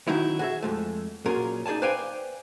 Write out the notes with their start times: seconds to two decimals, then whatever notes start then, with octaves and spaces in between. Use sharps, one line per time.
0.08 D#3 F#3 C#4 D#4 E4
0.39 F#4 G#4 E5
0.63 F2 G#3 A3
1.26 A#2 F#3 C#4 F4 G#4 A#4
1.66 D#4 G#4 D5 G#5 A5
1.82 B4 C5 D5 F5 G5 G#5